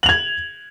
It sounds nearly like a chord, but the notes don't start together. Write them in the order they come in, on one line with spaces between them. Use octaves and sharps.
F#7 F7 G#6